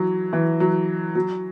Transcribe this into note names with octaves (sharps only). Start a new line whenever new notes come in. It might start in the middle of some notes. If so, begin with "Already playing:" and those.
Already playing: E3 F#3
E3
F#3
F#3